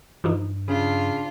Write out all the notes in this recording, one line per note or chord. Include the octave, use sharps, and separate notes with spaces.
G2 E3 F3 D#4
C#3 D4 F4